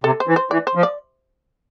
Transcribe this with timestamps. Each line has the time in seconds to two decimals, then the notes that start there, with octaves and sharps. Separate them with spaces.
0.04 C3 A4
0.20 C5
0.27 E3
0.36 C5
0.51 E3 D5
0.67 C5
0.75 F3
0.83 D5